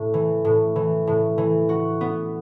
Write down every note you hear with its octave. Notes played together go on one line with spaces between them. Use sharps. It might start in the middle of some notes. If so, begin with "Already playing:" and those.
Already playing: A2
E3
A2
E3
A2
E3
F#4
B3